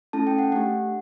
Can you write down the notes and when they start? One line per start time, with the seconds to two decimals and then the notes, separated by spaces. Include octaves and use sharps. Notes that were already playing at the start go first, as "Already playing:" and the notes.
0.13 A3 C#4 E4 A4 A5
0.27 G5
0.39 F#5
0.52 A3 D4 G4 F#5